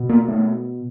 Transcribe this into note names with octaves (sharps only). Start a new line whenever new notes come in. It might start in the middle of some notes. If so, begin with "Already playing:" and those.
Already playing: B2
A#3
A3